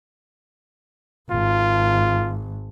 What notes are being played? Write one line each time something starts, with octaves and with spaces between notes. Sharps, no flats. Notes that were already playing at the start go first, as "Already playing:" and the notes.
G#1 F4